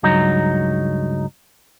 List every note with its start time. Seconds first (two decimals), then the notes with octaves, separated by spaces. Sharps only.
0.03 C#2 G2 F#3 D#4